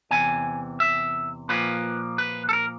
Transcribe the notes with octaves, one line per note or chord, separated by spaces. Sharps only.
E2 C3 E3 G#5
E5
A#2 F3 A#3 B4
B4
A4
A#4